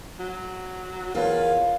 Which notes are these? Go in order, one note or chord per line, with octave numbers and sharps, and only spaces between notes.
F#3
E2 F4 A#4 B4 C#5